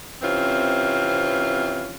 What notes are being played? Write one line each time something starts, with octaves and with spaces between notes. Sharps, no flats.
C3 E3 C4 C#4 F4